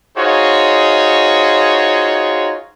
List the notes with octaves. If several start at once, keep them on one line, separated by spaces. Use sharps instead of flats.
D#4 F4 F#4 G#4 C5 C#5